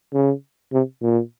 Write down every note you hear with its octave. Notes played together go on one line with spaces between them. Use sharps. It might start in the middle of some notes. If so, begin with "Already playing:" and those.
C#3
C3
A#2